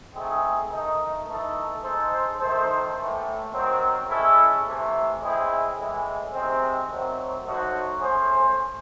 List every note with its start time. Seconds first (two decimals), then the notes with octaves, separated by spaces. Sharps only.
0.14 A3 C4 D#4 G#4
0.70 D#3 A3 D#4
1.26 E3 A3 D#4 A4
1.82 G#3 D#4 A4 C5
2.39 D#3 A3 D#4 A4 C5
2.95 A2 E3 A3
3.51 D#3 F#3 C4
4.08 G#3 C#4 E4 A4
4.63 C3 E3 A3
5.20 A2 G#3 C4 E4 G#4
5.76 A2 E3 G#3
6.33 C3 D#3 G#3 C4
6.89 D#3 F#3 A3 C4
7.45 F#3 A3 D#4 F#4 C5
8.01 A3 C#4 G#4 C5